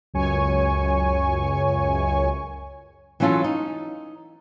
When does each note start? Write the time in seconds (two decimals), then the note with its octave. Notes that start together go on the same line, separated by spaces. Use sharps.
0.14 C#2 F#2 C#5 G#5 C#6
3.20 E3 F#3 C#4 F4 A4
3.44 D#4